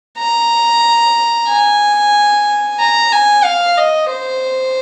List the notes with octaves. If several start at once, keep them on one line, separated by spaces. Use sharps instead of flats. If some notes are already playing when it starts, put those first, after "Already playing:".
A#5
G#5
A#5
G#5
F5
D#5
C5